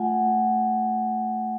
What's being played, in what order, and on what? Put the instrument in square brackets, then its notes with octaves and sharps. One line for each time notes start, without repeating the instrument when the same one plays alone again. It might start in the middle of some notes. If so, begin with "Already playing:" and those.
Already playing: [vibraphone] A3 F4 F#5 G#5